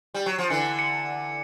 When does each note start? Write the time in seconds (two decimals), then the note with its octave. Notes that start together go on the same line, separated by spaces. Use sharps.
0.14 G3
0.26 F#3
0.38 F3
0.50 D3 E3 C#7
0.79 C#7